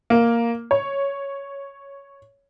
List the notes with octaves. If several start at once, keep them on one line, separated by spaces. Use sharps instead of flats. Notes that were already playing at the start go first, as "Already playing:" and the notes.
A#3
C#5